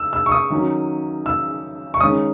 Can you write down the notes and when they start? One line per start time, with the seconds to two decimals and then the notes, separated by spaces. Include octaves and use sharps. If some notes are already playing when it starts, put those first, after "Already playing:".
Already playing: E6
0.13 E6
0.26 C#6
0.32 D#6
0.50 D#3 F#3 C#4
1.26 E6
1.94 C#6
2.00 D#3 G#3 C#4 D#6